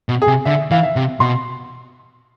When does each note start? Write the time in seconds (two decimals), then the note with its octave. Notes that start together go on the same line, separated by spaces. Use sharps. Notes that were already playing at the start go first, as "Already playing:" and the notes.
0.09 B2
0.22 G#4
0.27 C3
0.45 D3 E5
0.71 E3 F5
0.83 E5
0.96 C3
1.20 B2 C6